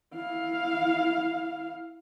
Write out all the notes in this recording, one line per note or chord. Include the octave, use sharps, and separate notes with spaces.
E4 F5